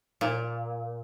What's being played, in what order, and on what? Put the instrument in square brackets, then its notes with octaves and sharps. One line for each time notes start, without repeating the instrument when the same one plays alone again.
[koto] A#2